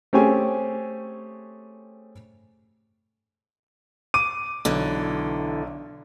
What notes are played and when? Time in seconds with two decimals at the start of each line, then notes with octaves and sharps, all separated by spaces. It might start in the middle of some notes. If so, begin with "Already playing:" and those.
0.13 A3 C4 C#4 G4 G#4 G#5
4.14 D6 D#7
4.65 B1 D3 E3